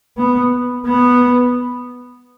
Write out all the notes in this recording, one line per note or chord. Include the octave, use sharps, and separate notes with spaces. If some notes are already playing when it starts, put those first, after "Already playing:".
B3
B3